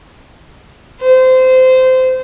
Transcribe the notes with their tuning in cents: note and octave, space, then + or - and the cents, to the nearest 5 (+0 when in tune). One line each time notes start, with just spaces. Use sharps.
C5 -20